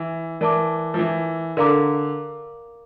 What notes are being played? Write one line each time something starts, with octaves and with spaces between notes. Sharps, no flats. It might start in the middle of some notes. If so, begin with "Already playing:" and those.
Already playing: E3
E3 A#4 D5 A5 D6
F3
E3
D3 A#4 D5 F5 A#5 D6